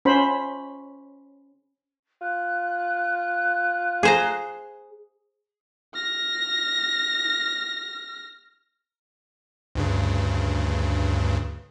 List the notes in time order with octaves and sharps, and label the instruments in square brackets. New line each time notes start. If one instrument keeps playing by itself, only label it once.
[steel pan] C#4 C5 B5
[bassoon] F4 [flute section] F#6
[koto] G#4 C5 A#5
[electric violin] F6 A#6
[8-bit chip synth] D2 G2 C#3